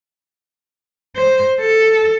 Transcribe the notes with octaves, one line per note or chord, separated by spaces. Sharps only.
C5
A4